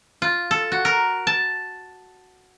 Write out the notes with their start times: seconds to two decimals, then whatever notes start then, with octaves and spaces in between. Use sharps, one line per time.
0.22 F4
0.51 A4
0.72 F#4
0.85 A#4
1.27 A5